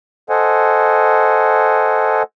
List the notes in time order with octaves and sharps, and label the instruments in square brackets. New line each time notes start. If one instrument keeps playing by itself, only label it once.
[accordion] A4 C5 D#5 F#5 G#5